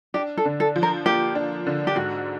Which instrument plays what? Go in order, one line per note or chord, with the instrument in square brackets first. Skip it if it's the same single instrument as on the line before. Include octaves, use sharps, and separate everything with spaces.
[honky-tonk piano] D4 [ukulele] G4
[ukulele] A4
[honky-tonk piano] D3
[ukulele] A4
[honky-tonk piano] F3
[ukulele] A#4
[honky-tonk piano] A#3 [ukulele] G4
[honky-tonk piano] D4
D3
[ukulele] G4
[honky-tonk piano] G#2 [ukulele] F#4